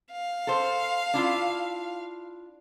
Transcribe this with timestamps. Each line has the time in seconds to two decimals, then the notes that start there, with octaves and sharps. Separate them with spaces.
0.12 F5
0.47 A4 C5
1.14 D4 E4 F4